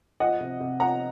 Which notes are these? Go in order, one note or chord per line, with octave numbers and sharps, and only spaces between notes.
F3 D#5 F#5
C3
C3
F3 F#5 A#5